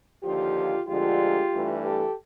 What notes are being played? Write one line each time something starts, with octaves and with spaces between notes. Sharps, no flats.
D#2 D3 F3 F4 G4
D2 D3 F3 G#3 F4 G4
G2 E3 A3
G4 A4